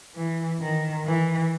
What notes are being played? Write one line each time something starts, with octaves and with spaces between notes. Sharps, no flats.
E3
D#3
E3